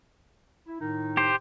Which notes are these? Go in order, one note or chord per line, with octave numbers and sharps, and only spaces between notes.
E4
A2 D#3 D#4
G4 C5